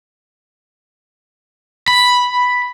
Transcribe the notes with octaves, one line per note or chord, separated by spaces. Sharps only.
B5